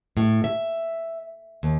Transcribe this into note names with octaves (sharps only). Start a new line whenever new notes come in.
A2
E5
D#2